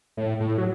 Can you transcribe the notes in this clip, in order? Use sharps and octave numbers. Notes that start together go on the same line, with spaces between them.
A2
A2
F#3